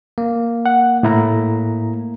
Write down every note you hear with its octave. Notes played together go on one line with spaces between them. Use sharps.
A#3
F#5
A2 E4 A#5